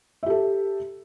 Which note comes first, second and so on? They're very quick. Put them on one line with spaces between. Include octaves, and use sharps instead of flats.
E5 G4 A4